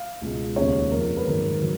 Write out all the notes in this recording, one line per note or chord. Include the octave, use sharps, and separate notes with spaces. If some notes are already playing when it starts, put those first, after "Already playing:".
Already playing: F5
C#2 B2 G#3
D#2 C#3 G#3 C#5
F2 F3 G#3 A#4
B4
G#2 D#3 F#3 A#4
D#3 F#3